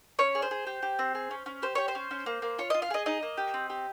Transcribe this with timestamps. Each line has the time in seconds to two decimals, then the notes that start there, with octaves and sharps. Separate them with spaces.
0.19 C#4 C#5
0.35 G#4
0.42 C5
0.51 G#4
0.67 G4
0.83 G4
0.99 C4
1.15 G#4
1.31 C#4
1.46 C#4
1.62 G4 C5
1.75 G4 C#5
1.88 C5
1.95 C#4
2.11 C#4
2.26 A#3
2.42 A#3
2.58 F4 C#5
2.70 F4 D#5
2.82 F5
2.90 G#4 D#5
3.06 D#4 D#5
3.22 A#3
3.37 G4
3.54 C4
3.70 G4